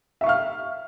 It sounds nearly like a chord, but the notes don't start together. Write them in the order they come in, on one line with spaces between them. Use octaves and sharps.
E5 C#6 F5 F6